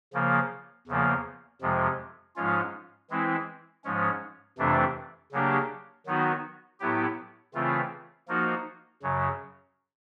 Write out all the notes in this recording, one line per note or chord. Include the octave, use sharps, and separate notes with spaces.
C#3 F3 A#3
E2 C#3 F3 A#3
F2 C3 F3 G#3
G#2 F3 G#3 C#4 F4
E3 G#3 C4 E4
G#2 F3 G#3 C#4
F2 C3 E3 A3 D4
C#3 F#3 A#3 D4 G4
D#3 F#3 B3 D#4 F#4
A2 F#3 B3 E4 G4
C#3 E3 A3 C4 F4
F3 A#3 D#4 F#4
F#2 C#3 F#3